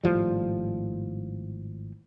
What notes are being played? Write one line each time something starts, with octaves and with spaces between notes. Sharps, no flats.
G#1 A2 F3 G3